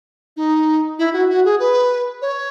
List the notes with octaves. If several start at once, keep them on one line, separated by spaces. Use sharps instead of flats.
D#4
E4
F#4
F#4
G#4
B4
C#5